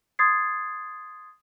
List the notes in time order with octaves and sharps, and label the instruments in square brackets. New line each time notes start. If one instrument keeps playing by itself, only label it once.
[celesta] C6 D#6 G#6 A6 C7